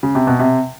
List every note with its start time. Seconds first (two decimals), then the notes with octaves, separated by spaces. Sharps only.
0.03 C#3
0.15 C3
0.27 B2
0.39 C3